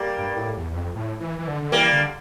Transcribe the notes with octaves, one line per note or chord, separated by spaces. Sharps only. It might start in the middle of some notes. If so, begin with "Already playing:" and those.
Already playing: G3 A#3
G2
A2
E2
E2
F2
A2
E3
E3
D3
D3
E3 G3 A#3
D3